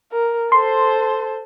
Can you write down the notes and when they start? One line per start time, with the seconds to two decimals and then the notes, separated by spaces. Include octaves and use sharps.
0.12 A#4
0.52 A4 C5 C6